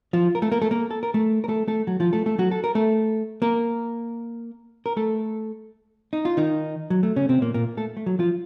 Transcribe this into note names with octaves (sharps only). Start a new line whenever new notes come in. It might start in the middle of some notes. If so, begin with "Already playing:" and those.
F3 F4
A#4
A3 A4
A#3 A#4
A3 A4
A#3 A#4
A4
A#4
A3 A4
A#4
A3 A4
A3 A4
F#3 F#4
F3 F4
A3 A4
A3 A4
F#3 F#4
A4
A#4
A3 A4
A#3 A#4
A#4
A3 A4
D#4
F4
D#3 D#4
F#3
A3
C#3 C#4
C3 C4
A#2 A#3
A#2 A#3
A3 A4
A3
F#3
F3 F4